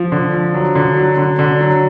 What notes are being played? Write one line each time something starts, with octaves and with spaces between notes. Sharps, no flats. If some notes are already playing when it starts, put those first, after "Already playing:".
Already playing: F3
D3
F3
F#3
D3
F#3
D3
D3
F#3